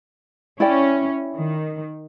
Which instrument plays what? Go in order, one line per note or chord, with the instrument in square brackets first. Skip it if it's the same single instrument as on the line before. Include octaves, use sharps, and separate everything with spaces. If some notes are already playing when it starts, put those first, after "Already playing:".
[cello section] C#4 [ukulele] E4 D5 G5
[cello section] D#3